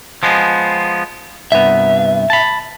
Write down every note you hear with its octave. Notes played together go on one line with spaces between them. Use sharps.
F3 G#3 B3
C2 G2 B3 E5
A5 B5